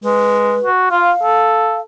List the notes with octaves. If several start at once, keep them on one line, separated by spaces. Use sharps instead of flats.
G#3 B4
F#4
F4 F5
A4